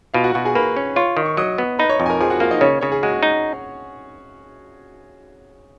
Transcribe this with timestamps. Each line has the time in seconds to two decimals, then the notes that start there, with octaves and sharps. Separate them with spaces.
0.14 B2 F4 F5
0.24 F#4 F#5
0.34 B2 F#4 F#5
0.45 G#4 G#5
0.55 A#3 B4 B5
0.76 C#4
0.96 F4 C#5 C#6
1.17 D#3
1.26 C#6
1.37 F#3 D#5 D#6
1.58 B3
1.79 D#4 B4 B5
1.89 C#5 C#6
2.00 F2
2.06 G#5
2.10 A#4 A#5
2.21 F3 G#4 G#5
2.30 F#4 F#5
2.40 A#3 F4 F5
2.51 D#4 D#5
2.61 C#3 C#4 C#5
2.81 C#3 C#4 C#5
2.92 G#4
3.03 G#3 F#4
3.23 D#4